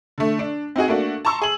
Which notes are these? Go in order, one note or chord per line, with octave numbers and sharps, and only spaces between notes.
D3 A3
D4
C4 D#4 F#4 G#4
A3 A#3 D4 F#4
A5 A#5 C6 C#6 E6
G#4 F#7